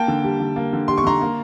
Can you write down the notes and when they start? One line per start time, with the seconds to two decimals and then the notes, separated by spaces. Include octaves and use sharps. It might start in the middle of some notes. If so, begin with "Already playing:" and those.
Already playing: A#3 G5 A5
0.08 D3
0.24 G3
0.40 D3
0.56 A#3
0.73 D3
0.88 G3 C6
0.98 C#6
1.04 D3 A#5 C6
1.21 A#3